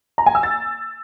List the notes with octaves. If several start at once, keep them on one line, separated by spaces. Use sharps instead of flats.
A#5
G#5
E6
A6